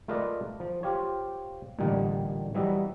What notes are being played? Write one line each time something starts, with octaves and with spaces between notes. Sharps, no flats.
A3 F4 A#4 B4 D5 D#5
F3
F4 G4 C5 C#5
A1 A#2 D3 G3 D#4
E3 F#3 G3 D#5 E5